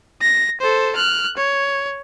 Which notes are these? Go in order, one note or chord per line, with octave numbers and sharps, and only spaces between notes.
A#6
A4 C5
F6 F#6
C#5